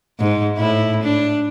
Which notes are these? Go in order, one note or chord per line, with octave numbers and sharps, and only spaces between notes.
G#2
A2 E4
D4